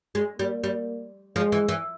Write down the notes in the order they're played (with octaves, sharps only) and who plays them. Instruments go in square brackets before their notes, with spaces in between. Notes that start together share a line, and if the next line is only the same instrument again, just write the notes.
[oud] G#3
[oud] G3 [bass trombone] A#3
[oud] G3
[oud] F3 [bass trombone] G#3
[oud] E3
E3